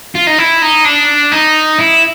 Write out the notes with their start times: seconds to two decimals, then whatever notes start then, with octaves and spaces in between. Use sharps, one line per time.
0.15 F4
0.27 D#4
0.39 E4
0.62 D#4
0.85 D4
1.32 D#4
1.78 E4